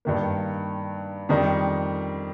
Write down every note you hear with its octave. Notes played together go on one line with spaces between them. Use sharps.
G2 D#3 A#3
F2 D#3 G3